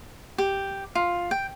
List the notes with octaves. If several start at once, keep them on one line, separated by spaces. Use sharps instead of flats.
G4
F4
G5